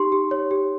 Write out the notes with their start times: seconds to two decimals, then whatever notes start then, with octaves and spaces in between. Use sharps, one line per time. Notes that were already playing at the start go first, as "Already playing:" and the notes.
Already playing: D#4 G4 C6
0.12 G4
0.31 C#5
0.51 G4